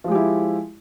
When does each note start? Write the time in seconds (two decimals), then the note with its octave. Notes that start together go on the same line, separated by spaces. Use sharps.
0.04 F3
0.08 G#3
0.11 G4
0.15 E4